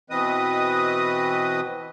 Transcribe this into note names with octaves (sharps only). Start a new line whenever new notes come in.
B2 E3 C4 B4 D#5 D#6